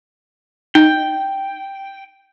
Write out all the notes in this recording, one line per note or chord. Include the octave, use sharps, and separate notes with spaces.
D#4 G5